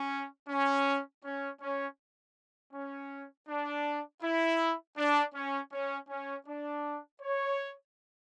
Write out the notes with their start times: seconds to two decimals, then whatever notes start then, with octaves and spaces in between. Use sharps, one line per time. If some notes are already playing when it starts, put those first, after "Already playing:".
Already playing: C#4
0.49 C#4
1.24 C#4
1.61 C#4
2.73 C#4
3.49 D4
4.23 E4
4.97 D4
5.34 C#4
5.72 C#4
6.09 C#4
6.47 D4
7.21 C#5